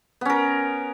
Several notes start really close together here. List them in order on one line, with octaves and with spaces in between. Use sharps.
B3 C#4 A#4